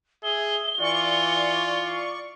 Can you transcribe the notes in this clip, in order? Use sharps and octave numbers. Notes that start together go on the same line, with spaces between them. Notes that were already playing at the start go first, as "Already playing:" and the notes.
G#4 E5 G7
E3 F4 D5 C#6